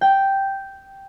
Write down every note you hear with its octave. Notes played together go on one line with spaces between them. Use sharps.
G5